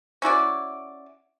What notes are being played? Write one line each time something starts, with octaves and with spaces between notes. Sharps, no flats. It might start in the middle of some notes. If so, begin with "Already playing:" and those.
C#4 E4 F#4 D5